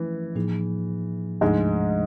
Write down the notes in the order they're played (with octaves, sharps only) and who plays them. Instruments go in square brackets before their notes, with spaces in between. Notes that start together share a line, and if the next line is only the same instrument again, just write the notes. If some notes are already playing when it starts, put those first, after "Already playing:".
Already playing: [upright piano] E3 [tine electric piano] F3 A3 C#4
[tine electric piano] A2 F3 A#3 D#4 G#4
[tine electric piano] D2 C3 F3 A3 D4 [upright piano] G#2 G#3